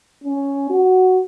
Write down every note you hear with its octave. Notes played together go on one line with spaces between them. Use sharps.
C#4
F#4